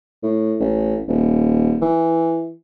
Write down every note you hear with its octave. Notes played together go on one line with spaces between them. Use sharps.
A2
A1
D#1
E3